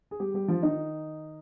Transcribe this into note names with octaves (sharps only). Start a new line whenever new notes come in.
G#4
G3 G4
G3 G4
F3 F4
D#3 D#4